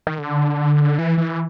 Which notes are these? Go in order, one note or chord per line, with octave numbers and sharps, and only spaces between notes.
D#3
D3
E3
E3